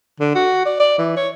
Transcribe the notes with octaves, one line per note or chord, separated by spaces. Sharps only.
D3
F#4
D5
D5
E3
C#5